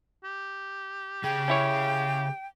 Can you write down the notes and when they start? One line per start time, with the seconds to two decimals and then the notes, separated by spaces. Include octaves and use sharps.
0.24 G4
1.24 C#3 G#4 G5
1.48 C#4 E4 C#5